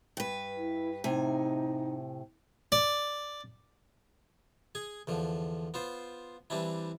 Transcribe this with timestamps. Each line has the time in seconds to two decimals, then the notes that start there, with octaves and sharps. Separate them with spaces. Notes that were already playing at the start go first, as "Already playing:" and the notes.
0.17 G2 B4
0.57 E4
1.04 A2 C3 D#4 G#5
2.72 D5
4.75 G#4 G#5
5.07 E2 D3 F3
5.74 B3 F4 C5
6.50 E3 G3 C4 D4 E4